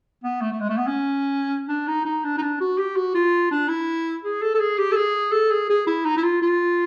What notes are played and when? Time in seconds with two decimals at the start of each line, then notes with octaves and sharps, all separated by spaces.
0.24 B3
0.41 A3
0.52 A3
0.60 G#3
0.69 A3
0.78 B3
0.87 C#4
1.69 D4
1.87 D#4
2.05 D#4
2.24 D4
2.38 D#4
2.42 D4
2.60 F#4
2.78 G4
2.96 F#4
3.15 F4
3.51 D4
3.69 E4
4.24 G#4
4.42 A4
4.55 A4
4.60 G#4
4.78 G4
4.92 A4
4.96 G#4
5.32 A4
5.51 G#4
5.69 G#4
5.87 E4
6.05 D#4
6.17 E4
6.23 F4
6.42 F4